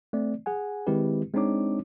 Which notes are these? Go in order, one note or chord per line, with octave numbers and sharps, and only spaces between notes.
A3 C4 D5
G#4 F#5 G#5
D#3 G#3 C4 E4 G4 B4
G#3 C4 D4 D#4 C#5 D6